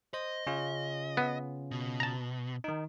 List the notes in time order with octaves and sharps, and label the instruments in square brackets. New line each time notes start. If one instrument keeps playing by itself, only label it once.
[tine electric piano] C5 [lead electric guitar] D#5
[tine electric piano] C#3 C#4 F4
[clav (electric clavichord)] B3
[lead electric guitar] B2
[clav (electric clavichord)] A5 A#5
[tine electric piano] D#3 D#4